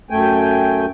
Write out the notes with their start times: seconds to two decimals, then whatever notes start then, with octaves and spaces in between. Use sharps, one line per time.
0.10 F#2 A3 G5 G#5